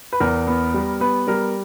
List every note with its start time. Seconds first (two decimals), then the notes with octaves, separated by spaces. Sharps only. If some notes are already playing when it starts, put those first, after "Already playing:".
0.13 B4
0.20 E2 A#4
0.47 B3
0.74 G3
1.00 B3 B4
1.27 G3 A#4